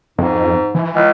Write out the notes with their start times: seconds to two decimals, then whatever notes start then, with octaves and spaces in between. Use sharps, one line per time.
0.18 F2 G#2
0.75 E3
0.93 C#2